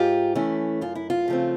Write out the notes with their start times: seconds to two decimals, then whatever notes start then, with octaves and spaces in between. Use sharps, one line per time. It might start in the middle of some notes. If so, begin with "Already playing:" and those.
Already playing: G#2 F4 G4
0.35 E3 A3 C#4 E4
0.81 F#2 F4
0.95 E4
1.10 F4
1.28 C#3 F3 A3 C4